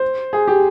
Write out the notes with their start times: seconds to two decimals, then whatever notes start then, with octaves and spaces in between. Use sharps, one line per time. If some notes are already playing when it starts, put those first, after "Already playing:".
Already playing: C5
0.33 G#4
0.48 G4